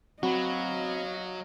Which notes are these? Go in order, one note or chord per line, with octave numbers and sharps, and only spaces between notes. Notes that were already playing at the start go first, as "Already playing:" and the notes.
F#3 C4 F#4 D#5 F5 B5